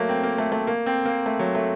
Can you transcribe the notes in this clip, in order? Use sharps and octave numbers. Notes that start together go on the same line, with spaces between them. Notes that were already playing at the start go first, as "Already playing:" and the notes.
Already playing: F#3 A3 A#3
C4
A#3
A3
A3
A#3
C4
A#3
A3
F#3
A3